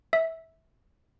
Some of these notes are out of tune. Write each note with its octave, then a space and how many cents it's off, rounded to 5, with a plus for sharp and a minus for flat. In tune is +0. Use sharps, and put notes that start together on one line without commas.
E5 -20 E6 +0